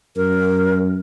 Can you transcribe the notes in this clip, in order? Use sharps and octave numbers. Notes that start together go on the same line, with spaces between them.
F#2 A#4